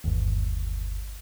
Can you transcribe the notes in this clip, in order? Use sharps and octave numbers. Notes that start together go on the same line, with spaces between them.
G1 D#2